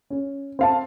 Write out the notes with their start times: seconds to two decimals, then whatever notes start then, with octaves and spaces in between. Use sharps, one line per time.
0.10 C#4
0.59 C4 F5 A5